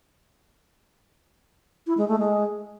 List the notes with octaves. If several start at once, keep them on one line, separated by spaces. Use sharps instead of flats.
E4
G#3
A3
G#3